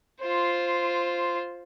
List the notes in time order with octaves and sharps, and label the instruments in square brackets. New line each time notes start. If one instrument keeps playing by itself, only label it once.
[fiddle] F4 C5